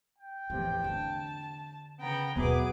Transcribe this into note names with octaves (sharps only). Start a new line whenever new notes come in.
G5
E2 A2 C3 F3
D3 A5
C#3 B3 G5 A#5
D#2 B2 F#3 B3 E4 G#4 B4 D6